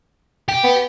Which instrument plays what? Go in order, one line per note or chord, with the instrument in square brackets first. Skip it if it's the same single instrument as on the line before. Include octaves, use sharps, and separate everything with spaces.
[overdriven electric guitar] G4
[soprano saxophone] B3